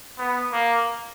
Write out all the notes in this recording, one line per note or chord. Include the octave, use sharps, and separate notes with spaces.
B3
A#3